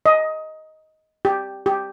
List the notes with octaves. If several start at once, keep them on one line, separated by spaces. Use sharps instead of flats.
D#5
G4
G4